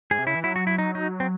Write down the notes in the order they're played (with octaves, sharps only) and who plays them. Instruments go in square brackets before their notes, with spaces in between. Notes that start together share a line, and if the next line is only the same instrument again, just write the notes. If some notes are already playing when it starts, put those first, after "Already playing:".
[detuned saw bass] G#2 [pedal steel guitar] G#4
[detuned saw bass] C3
[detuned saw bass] C#3 [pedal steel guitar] E4
[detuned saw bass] E3
[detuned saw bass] F#3 [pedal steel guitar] E4
[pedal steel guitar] F#4
E4
D#4
D#4
C4